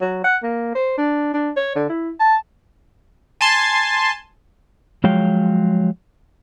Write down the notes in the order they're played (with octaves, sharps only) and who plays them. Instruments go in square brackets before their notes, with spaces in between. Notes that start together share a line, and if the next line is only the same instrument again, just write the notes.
[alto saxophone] F#3
F#5
A#3
C5
D4
D4
C#5
D3
E4
A5
[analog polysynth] G#5 A5 C6
[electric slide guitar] F3 F#3 G#3 C#5 F5 G5